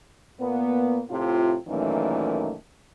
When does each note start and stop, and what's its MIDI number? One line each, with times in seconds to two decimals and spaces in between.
0.40 1.00 46
0.40 1.00 58
0.40 1.00 59
1.09 1.55 45
1.09 1.55 48
1.09 1.55 65
1.68 2.53 42
1.68 2.53 46
1.68 2.53 51
1.68 2.53 52
1.68 2.53 57